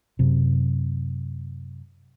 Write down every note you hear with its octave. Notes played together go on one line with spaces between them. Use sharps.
F#2 C3